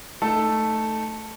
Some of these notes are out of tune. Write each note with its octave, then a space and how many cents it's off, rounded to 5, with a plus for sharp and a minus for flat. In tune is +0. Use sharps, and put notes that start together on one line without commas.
A3 +0 D#4 +0 A4 +0